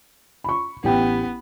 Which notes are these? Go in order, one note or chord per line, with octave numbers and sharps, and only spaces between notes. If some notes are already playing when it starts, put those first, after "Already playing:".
B5 C#6
A1 B3 G4 G5